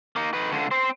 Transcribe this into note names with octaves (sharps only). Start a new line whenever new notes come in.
A#3 D#4
D#4 B4
C#2 D3
C4 C5